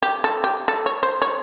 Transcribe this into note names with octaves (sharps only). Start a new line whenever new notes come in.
G4
A4
G4
A4
C#5
C5
C#5